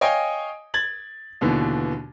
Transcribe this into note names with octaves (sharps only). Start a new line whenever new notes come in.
C#5 D#5 F5 G5 G#5
G#6 A6 F#7
D#2 B2 D3 E3